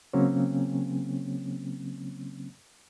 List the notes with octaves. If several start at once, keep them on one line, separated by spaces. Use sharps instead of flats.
C#3 F#3 A#3 C4 C#4